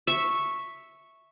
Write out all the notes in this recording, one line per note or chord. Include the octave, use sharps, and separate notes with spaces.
E5 C#6